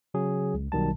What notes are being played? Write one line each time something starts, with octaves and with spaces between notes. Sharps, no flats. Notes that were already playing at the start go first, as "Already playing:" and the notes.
C#3 F#3 G#4
C#2
B1 B2 D#3 G3 A5